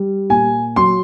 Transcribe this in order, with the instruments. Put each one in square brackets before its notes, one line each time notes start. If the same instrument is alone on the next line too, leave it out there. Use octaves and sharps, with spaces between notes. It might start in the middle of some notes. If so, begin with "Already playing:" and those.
Already playing: [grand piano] G3
A#2 G#5
F#3 C6